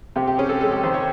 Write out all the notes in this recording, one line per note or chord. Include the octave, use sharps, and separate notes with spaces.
C3 G4
G4
C#4 G#4
A4
G#3 A4
G4
D#3 C5
C#5